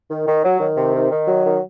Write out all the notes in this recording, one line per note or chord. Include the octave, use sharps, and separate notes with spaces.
D#3
D#3
F#3
D#3
C3
D#3
D#3
F#3
D#3